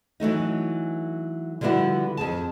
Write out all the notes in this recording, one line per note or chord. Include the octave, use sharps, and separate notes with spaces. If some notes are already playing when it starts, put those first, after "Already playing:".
E3 F#3 A3 D#4
D3 F3 G3 B3 E4 F#4
F2 G#4 A5